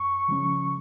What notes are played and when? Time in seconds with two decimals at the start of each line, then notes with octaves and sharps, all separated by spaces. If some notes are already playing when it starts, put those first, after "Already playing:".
Already playing: F#2 C#6
0.28 C#3 F3 G#3 C#4